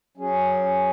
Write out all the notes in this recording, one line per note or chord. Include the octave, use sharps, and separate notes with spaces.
F#3 C#4 G#4